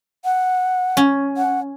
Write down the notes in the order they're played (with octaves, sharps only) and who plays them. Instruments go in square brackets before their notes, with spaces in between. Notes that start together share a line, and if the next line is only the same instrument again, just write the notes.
[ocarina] F#5
[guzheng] C#4
[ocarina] F#5